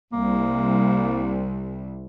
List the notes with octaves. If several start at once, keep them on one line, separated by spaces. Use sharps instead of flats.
C2 A#3